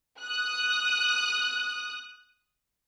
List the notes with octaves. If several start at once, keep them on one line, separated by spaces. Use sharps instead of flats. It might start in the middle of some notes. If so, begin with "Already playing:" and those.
D#6 F#6